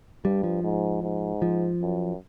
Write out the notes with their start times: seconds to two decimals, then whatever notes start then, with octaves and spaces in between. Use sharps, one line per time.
0.24 G2 G3
0.44 F3
0.63 G#2
1.02 G#2
1.42 F3
1.81 F#2